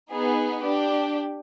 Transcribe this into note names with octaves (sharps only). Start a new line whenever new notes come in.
B3 D#4 G#4
D4 G4